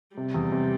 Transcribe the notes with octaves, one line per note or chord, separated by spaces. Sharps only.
C3 G3
E2
C3